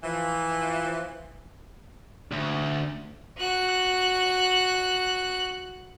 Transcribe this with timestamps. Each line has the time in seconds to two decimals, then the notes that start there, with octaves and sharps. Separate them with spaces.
0.03 E3 F3
2.32 D2
3.38 F#4 F#6